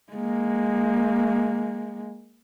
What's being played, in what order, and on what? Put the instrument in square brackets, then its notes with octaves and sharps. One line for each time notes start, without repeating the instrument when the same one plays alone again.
[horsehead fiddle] G#3 A#3